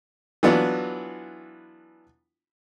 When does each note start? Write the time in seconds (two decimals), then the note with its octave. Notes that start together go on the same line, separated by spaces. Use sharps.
0.43 E3 F#3 B3 D4 F4